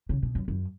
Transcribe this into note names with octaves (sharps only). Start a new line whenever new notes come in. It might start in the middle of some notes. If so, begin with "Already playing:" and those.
C#3
B2
F#2
F#2